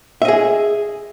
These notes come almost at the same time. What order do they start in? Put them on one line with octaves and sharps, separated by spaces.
E5 D#5 G#4